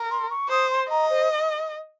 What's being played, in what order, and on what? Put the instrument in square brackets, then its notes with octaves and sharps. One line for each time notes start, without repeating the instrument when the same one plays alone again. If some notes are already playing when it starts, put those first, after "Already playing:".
Already playing: [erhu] A#4
[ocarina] C6
C#6
[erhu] C5 [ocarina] D#6
[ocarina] C6
[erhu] D#5 [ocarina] A#5
[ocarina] C5